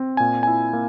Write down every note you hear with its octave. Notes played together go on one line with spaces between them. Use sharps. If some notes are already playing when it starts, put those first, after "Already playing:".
Already playing: C4
A#2 G#5
E4 G#5
A#3